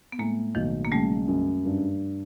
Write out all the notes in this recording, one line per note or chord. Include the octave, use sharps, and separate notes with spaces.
B3
A2 G#3 A#3
B1 D#3 F3
A#3
C#3 G3 A3
F#2
G2